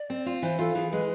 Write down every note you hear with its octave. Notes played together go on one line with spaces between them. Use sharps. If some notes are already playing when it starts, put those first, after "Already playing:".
Already playing: D5
C4
F4
E3 C5
F4 A4
E3 G#4
G#3 B4